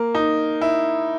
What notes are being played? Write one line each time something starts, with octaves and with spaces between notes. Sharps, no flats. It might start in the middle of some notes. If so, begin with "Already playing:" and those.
Already playing: A#3
D#4
E4